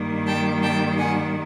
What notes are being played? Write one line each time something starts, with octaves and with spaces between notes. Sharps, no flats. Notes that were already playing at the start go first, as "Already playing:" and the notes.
Already playing: G2 D#3 G3 A#3
G5 A5
G5 A5
F#5 G#5